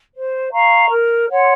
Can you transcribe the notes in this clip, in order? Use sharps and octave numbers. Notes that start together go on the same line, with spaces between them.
C5
F5 A#5 C#6
A#4
C#5 F#5 C6